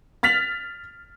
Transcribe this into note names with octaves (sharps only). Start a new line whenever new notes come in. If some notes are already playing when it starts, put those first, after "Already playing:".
F6 A6 B6 F7 F#7